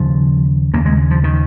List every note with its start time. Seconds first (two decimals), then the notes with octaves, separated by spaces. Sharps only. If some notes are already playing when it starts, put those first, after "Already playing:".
Already playing: D#2 C#3 F3
0.73 D#2 C#3 A#3
0.86 G#3
1.11 F3
1.24 D#3